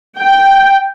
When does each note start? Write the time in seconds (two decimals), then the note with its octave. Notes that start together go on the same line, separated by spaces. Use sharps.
0.18 G5